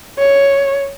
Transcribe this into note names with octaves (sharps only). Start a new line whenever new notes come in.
C#5